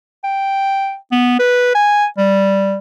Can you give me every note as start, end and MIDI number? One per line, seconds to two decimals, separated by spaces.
0.24 0.96 79
1.12 1.35 59
1.39 1.73 71
1.75 2.06 80
2.18 2.77 55